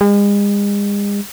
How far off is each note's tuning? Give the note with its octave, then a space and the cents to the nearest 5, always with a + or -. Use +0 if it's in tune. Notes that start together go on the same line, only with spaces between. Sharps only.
G#3 -40